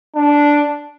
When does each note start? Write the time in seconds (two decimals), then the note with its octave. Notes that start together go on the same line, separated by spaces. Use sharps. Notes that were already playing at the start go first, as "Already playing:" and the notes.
0.15 D4